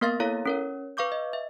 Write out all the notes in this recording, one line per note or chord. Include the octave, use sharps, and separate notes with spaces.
A#3 B3 A#4 F5 C6 A6
E4 A4 C#5 F5 A#5
C#4 A#4 C#5
B4 F5 C#6 D6 G6
D#5
E5